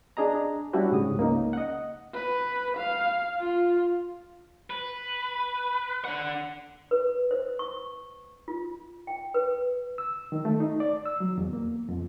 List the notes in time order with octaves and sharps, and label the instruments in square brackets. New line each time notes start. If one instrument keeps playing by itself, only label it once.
[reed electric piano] D4 G#4 D#5 A#5
G3 C#4 D4 E4 F#4 G4
G#2 C#3 D#6
C#2 A#3 C#4 D#4
D#5 F#5
[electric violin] B4
F5
F4
[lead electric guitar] B4
D4 F#5
[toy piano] B4
C5
C#6
F4
G5
B4
[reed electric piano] E6
D#3
A3
D#4
D5
E6
F#3
E2
A#3
F2